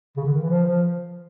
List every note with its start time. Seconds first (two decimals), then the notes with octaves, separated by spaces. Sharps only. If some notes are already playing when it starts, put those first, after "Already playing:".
0.17 C#3
0.25 D3
0.33 D#3
0.42 E3
0.50 F3
0.66 F3